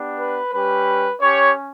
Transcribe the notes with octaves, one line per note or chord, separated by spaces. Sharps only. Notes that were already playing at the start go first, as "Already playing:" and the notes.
Already playing: B3 D4 G4
B4
G3 C#4 G4 B4
C#4 G4 C#5